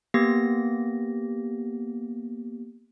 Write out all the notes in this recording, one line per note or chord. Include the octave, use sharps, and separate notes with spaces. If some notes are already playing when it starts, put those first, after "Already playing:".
A#3 B3 G4 A#6